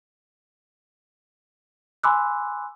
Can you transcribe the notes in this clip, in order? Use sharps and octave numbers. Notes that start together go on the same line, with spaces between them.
G#5 B5 C6 D6 E6 F#6